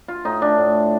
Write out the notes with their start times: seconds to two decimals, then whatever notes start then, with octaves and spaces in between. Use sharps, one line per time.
0.08 F4
0.25 A2 D#4
0.42 D4
0.58 A2